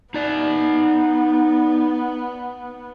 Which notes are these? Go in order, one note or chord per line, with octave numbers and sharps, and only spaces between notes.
B3 D#4 D5